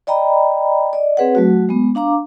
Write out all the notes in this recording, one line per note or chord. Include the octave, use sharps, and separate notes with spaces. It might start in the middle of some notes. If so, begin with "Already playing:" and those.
D5 D#5 G5 A#5 B5
D5 D#5
C4 G#4 B4 C#5 F#5
F#3 A3 F#4
G#3 B3
D4 F5 A#5 D6